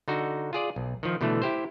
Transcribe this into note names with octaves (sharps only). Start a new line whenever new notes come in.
D3 D#4 F#4
F4 G#4 D5
B1
D#3 F3
B2 D3 E3 A3
E4 G4 C5